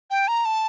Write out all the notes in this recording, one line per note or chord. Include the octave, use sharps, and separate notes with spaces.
G5
A#5
A5